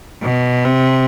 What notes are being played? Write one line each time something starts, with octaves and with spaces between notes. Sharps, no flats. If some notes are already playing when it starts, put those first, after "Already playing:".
B2
C3